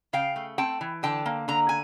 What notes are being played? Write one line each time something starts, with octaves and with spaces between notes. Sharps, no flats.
C#3 F5 G5
A3
C4 G5 A5
E3
D3 G5 A5
A#3
D3 A#5
G#5